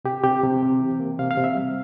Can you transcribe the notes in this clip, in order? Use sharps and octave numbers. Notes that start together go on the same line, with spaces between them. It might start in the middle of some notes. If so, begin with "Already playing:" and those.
C3 G4
C3 G4
C3
C3
E3
A#3
C3 F5
F5
C3
E5
G3